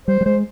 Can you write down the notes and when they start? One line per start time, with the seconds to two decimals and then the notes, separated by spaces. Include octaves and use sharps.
0.08 G3 C5
0.21 G3
0.25 G#3 C5